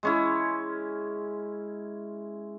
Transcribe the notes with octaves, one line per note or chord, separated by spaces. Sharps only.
G#3 C#4 E4